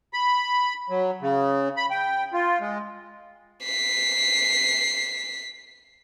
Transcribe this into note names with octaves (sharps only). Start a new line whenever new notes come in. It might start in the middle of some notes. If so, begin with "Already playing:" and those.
B5
F#3
C#3
B5
G5
F4
G#3
B6 C7